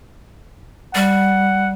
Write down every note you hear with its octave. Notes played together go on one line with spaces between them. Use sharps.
G3 F#5